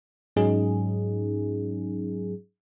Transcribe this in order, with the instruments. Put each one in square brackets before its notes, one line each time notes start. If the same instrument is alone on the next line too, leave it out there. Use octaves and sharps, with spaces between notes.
[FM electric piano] G#2 F#3 C#4 D#4 G#4